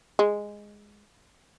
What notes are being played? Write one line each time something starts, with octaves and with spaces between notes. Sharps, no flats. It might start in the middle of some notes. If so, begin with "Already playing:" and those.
G#3